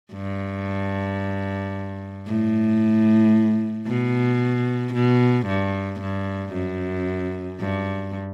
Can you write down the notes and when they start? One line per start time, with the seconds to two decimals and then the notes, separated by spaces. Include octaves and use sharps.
0.13 G2
2.27 A2
3.87 B2
4.94 B2
5.47 G2
6.01 G2
6.53 F#2
7.60 G2